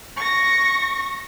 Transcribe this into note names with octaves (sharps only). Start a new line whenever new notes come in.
C#6 A#6